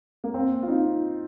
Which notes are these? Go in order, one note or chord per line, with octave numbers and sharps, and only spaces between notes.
A#3
C4
F4
D#4